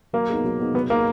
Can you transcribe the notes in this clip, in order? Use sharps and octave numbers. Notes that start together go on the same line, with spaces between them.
F#3 A#3
B3 D#4 G#4
F#3
B3 D#4 G#4
F#3 B3
A#3 B3 D#4 G#4